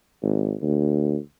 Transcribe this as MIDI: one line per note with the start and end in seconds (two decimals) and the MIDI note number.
0.22 0.54 32
0.62 1.17 38